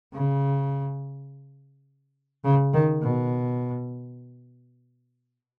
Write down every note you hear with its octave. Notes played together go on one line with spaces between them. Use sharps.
C#3
C#3
D#3
B2